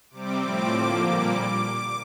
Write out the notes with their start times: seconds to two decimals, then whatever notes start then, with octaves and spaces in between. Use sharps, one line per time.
0.10 C3 G3 C4 D6
0.40 A2 F3 C4 D6
0.71 D3 F3 A#3
1.02 A#2 G3 A#3 D6